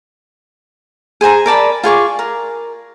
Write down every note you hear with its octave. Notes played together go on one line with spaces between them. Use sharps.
G#4 C5 G#5 A#5
A#4 D5 A5 B5
F4 G#4 C#6 D6
A#4